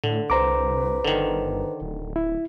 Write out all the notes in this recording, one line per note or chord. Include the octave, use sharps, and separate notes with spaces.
A2 D3
C2 B4 C5 A#5 D6
G1 D3 D#3
D1
E4